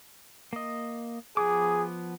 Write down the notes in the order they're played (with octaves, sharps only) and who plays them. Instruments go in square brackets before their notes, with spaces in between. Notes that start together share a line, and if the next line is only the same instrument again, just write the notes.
[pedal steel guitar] A#3 D#5
[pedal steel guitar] F3 B3 D6 [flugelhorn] G#4